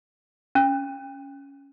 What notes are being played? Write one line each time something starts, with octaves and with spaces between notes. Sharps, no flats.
C#4